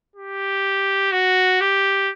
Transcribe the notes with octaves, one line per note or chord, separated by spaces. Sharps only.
G4
F#4
G4